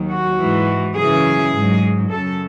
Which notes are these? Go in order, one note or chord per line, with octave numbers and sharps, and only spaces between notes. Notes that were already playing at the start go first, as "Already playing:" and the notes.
Already playing: D#2 D#3 F#3
F#4
G#2 E3
F#2 C#3 E3 G#4
G#2 F#3
F#2 C#3 F#3 A4